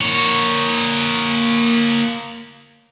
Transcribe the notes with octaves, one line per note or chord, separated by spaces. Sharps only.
A#3 C#5